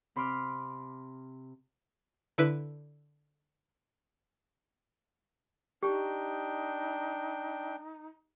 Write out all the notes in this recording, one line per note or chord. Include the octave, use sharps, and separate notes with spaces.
C3 B5 C6 D6 F6
D3 E4 B4
D4 D#4 G4 G5